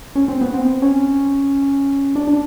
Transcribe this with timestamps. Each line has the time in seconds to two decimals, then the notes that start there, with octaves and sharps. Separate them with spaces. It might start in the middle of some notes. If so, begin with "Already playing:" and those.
0.16 C#4
0.28 C4
0.41 B3
0.54 C4
0.82 C#4
2.16 D4
2.27 D4